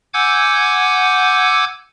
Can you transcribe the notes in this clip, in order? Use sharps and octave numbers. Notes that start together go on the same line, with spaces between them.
F#5 G#5 D6 E6 G6 G#6